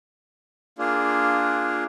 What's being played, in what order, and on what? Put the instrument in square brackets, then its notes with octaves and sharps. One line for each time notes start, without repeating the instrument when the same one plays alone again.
[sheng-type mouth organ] A#3 D4 F4 G#4